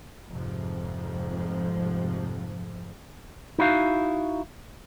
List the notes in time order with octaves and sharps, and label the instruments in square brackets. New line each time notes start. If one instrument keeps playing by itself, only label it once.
[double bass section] F1 F2 G#2 C3 F3
[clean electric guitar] D#4 E4 F#4 F5